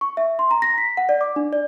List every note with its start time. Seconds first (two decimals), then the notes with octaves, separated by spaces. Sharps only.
0.01 C#6
0.17 E5
0.39 C6
0.51 A#5
0.62 A#6
0.78 B6
0.97 F#5
1.09 D5
1.21 D6
1.36 D4
1.53 D5